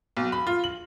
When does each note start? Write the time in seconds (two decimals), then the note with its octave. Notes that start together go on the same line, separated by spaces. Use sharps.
0.17 B1
0.32 B5
0.47 F4
0.64 F#7